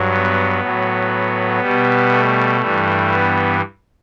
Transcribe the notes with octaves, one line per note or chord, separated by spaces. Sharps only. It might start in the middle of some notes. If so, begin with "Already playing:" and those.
Already playing: G2 F#3
B3
A2 F#3
B2 G3
A3
G2 E3 G3
B3